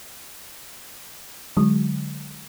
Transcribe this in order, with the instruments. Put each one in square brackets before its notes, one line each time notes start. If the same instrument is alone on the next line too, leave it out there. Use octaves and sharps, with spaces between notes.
[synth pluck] D3 F#3 G#3